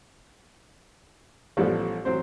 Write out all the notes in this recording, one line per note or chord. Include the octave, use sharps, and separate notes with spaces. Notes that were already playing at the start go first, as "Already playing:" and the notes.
A1 F3 G3 B3 A4
A1 F#3 C4 C5